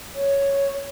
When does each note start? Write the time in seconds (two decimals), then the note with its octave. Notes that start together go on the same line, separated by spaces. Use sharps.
0.15 C#5